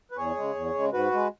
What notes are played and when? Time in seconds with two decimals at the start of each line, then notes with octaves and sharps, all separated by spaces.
0.11 B4
0.17 E2 G#4 C#5
0.37 C#3 G#3
0.55 E2
0.74 C#3 G#3
0.93 G#2 F#4 B4
1.13 G#3